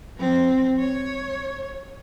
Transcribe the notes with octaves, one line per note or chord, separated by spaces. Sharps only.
F3 C4
C#5